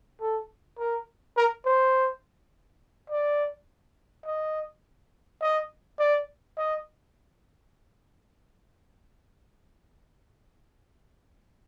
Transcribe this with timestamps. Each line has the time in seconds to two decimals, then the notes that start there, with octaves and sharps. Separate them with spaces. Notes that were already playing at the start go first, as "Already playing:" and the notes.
0.21 A4
0.79 A#4
1.37 A#4
1.65 C5
3.10 D5
4.26 D#5
5.41 D#5
5.99 D5
6.57 D#5